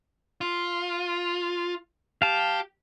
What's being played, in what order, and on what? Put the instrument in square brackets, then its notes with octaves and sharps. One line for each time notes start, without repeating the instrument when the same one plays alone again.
[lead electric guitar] F4
[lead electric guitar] G4 [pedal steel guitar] F5 A5